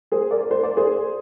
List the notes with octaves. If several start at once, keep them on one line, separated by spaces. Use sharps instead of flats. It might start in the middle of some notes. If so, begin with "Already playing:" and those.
G#4 C5
A#4 D5
C5
D5
G#4 C5